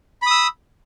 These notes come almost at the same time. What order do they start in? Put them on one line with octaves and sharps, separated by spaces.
B5 D#6 E6